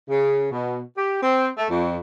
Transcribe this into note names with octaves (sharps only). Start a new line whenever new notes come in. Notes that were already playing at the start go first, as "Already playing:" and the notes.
C#3
B2
G4
C4
A3
F2